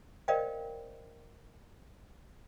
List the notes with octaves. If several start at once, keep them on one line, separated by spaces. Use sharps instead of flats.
A#4 C5 D5 D#5 F5 G5